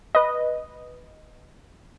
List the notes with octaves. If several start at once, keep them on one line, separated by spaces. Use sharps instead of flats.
B4 D#5